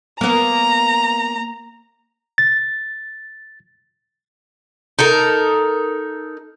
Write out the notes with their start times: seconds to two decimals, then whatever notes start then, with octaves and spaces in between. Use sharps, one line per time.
0.21 A#3 B3 A#5
2.38 A6
4.99 D#4 A4 A#4